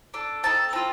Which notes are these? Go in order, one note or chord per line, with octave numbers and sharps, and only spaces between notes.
D4 A4
C4 D#4 A4 A5
C4 F4 A4